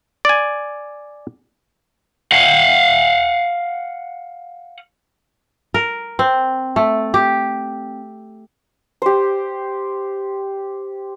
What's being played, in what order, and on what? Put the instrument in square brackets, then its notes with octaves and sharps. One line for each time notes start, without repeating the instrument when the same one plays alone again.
[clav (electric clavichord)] D5 G#5
[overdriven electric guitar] F5 F#5
[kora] A#4
C4
A3
G4
[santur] G4 C5